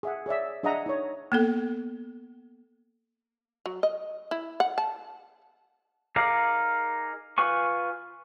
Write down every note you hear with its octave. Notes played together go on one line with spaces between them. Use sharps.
G#4 E5 F#5
G#4 C#5 D5 E5
D4 G#4 D#5 E5 F#5 A#5
D#4 C#5
A#3 B3 A4
F#3
D#5
E4
F#5
A5
D#4 G#4 A#4 D5 F5
F4 B4 G#5 C#6